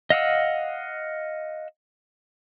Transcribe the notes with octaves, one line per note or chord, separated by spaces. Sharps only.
D#5 F5 F#5 E6